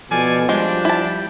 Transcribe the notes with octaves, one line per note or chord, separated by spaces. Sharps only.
B2 F3 A4 D5 G#5
F3 G3 G#3 D4
E4 A5